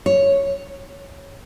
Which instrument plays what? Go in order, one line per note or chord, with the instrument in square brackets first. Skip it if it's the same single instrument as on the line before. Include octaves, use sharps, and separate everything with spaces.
[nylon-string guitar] C#5